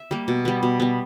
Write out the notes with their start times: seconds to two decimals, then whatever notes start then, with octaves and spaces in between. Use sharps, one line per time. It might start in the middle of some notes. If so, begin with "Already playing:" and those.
Already playing: E5
0.11 G3 A#3
0.28 B2
0.45 G3 B3
0.63 B2
0.80 G3 B3